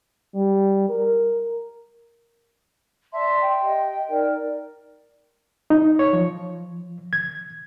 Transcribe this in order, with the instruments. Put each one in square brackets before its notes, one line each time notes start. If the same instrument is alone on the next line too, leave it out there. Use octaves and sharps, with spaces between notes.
[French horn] G3
A#4
[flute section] D5 A5 C6 [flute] E5
[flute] G5
[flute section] G4 D#5
D#4 A#4 D5
[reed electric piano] D#4
C#5
F3
G#6